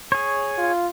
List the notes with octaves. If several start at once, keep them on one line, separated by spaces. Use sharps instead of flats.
G#4 C#5
F4